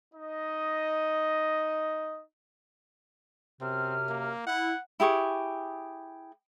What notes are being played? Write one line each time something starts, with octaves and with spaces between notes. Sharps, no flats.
D#4 D#5
F#2 C3 C4 F6
A#3
E4 F#5
E4 G4 G#4 C#6